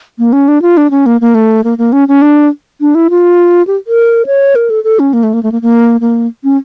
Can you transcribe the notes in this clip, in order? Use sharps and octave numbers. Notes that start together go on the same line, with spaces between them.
A#3
C#4
D4
F4
D4
C#4
A#3
A#3
A3
A#3
A#3
C#4
C#4
D4
D4
E4
F4
G4
A#4
C#5
A#4
A4
A4
C#4
A#3
A3
A#3
A3
A#3
A#3
A#3
C#4